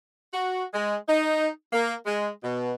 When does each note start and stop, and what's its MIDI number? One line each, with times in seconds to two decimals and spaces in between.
0.32 0.63 66
0.74 0.95 56
1.08 1.47 63
1.73 1.94 58
2.06 2.28 56
2.43 2.72 47